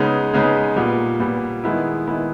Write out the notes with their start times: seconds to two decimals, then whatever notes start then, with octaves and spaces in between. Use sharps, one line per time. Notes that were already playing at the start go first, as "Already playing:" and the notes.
Already playing: C#3 G#3 B3 D#4
0.33 C#3 G#3 B3 D#4
0.76 A#2 G3 B3
1.20 A#2 G3 B3
1.64 D#3 G#3 B3 E4
2.07 D#3 G#3 B3 E4